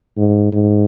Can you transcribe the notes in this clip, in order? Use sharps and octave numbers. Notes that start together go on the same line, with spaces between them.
G#2
G#2